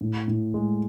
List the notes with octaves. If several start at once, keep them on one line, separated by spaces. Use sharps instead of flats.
A2
A2
G#3